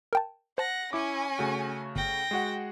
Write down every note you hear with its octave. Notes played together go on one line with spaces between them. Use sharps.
A#4 G5 A5
C5 F#5 A5 A#6
C#4 E4 G#5 D6
C#3 A3 F#4
G1 G5 A#6
G#3 F#4 F#5